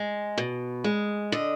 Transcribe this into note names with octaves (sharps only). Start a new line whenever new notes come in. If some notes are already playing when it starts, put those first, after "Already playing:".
Already playing: G#3
B2
G#3
D3 D#5